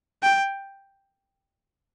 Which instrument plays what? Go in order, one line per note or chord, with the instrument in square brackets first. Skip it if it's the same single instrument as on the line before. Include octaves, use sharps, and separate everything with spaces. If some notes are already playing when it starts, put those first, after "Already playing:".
[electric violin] G5